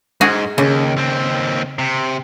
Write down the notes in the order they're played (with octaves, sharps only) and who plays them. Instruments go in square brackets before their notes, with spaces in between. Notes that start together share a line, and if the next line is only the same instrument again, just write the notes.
[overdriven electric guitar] G#2 [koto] F#4 G#4
[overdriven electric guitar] D#2 [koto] C#3
[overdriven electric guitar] D#2 C4
C3